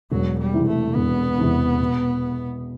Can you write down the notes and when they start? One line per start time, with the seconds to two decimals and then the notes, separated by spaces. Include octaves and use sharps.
0.11 E1 F#3
0.39 G3
0.53 E2 C3 E3
0.68 A3
0.95 E1 B3
1.37 E2 C3 E3
1.80 B2